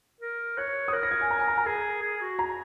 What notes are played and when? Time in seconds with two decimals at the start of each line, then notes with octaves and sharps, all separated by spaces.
0.21 A#4
0.58 C#5 F#6
0.88 D#6
0.93 A#4 F#6
1.03 A#6
1.11 G#6
1.21 G#5
1.31 A#5
1.39 G#5
1.48 A#5
1.58 A#5
1.66 G#4 G#5
2.02 G#4
2.21 F#4
2.39 A#5